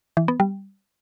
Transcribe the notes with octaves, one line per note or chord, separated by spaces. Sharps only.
E3
B3
G3